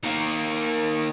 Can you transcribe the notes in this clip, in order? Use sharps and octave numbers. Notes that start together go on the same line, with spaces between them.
D#3 A#3